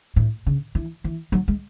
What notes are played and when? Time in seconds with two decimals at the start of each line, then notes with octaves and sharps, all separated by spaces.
0.16 A2
0.46 C#3
0.75 E3
1.04 E3
1.32 F#3
1.48 G#3